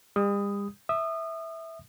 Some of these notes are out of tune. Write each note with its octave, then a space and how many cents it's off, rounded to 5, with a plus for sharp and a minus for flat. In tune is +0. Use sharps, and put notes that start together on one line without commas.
G3 +45 D#6 +0
E5 -10 D#6 -30